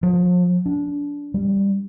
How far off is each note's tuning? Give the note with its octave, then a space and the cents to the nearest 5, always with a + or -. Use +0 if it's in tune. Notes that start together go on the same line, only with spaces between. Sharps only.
F3 +40
D4 -25
G3 +5